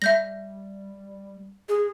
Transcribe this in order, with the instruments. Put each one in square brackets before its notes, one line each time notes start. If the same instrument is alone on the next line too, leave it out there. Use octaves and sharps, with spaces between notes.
[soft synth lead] G3 [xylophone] E5 G6 A#6
[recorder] G#4